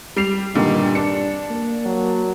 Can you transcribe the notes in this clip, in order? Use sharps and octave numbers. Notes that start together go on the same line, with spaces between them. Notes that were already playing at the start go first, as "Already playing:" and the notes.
G3 C7 F7
G2 A#2 D3 D#3 G3
D4 D5 C#7
A#3
F#3